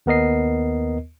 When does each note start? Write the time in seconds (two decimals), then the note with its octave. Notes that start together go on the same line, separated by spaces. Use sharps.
0.06 D#2 B3 A#4 D#5 C7